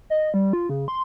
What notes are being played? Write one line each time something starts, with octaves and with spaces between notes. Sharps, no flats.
D#5
G3
F4
C#3
C6